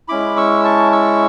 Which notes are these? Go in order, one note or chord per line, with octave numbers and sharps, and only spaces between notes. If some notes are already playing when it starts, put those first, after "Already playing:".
G#3 C#4 E4 B5 D6
C#6 E6
A5 C#6
C#6 E6